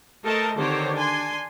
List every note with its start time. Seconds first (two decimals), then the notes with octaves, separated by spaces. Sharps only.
0.24 A3 A4 A#4 C5 D#5 A5
0.57 D3 D#3 C4 G4 C5 C#5
0.94 D4 G#5 C6